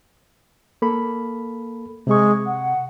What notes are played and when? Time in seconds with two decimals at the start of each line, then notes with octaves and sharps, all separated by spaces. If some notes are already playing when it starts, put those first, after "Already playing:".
0.82 A#3 A4 B5
2.07 C3 G#3 C#6
2.46 F#5